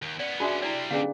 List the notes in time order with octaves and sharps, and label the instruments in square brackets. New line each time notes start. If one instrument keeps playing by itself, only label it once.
[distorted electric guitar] D#2
[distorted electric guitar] B3 C#4 [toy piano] D5
[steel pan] D4 G#4 [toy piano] F4 F#4 E5
[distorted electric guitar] G3 C4 [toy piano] E4 D5
[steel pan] D3 B3 D4 [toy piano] C#4 G#4 F5